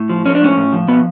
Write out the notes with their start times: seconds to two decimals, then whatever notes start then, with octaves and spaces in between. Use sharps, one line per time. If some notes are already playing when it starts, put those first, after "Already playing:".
Already playing: A2
0.09 F3
0.25 F3 C#4
0.35 D4
0.41 A2 C#4
0.57 A2
0.73 F3
0.88 B2 B3